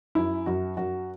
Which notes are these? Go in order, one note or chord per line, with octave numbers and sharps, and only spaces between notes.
F#2 E4
F#2 F#4
F#2 F#4